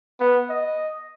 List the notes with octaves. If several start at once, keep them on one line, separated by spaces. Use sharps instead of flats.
B3
D#5